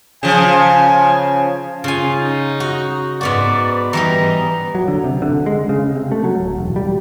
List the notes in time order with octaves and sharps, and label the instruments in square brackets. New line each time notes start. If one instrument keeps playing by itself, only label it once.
[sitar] C#3 F3 [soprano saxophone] G#5
[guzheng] C#3 G#5 [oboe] F4
[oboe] D#4
[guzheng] F#4
[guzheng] G#2 B3 F#4 [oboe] D5
[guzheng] E3 G3 D#4 [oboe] A#5
[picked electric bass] F#3
D3
C3
D3
G#3
C#3
C3
A3
F#3
D1
E1
G3